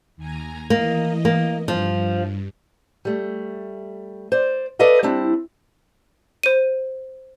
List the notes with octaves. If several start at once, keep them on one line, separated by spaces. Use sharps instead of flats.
D#2 G#5 A#5
E3 A#3 D#5
A#3
G2 F3
G3 A3
C5 D5
A4 B4 D5 D#5 F5
G3 C4 D4 E4
C5 D#7